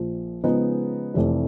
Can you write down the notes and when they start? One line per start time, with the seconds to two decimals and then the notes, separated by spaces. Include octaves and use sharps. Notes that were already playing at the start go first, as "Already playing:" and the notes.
Already playing: A#1 A#2 F3
0.44 C#3 F3 G#3 B3 D#4
1.14 F1 F2 C3 E3 A3